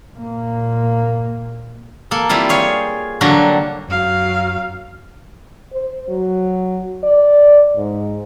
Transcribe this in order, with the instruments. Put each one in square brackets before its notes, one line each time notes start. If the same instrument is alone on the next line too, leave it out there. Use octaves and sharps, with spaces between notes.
[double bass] A#2 A#3
[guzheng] A#3 A4
G3 C4 E4 F4
G#4 C#5 F5 G5
D3 F#3 G3 A#3 F#4
[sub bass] F#2 [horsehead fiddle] F#3 F5
[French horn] C5
F#3
D5
G#2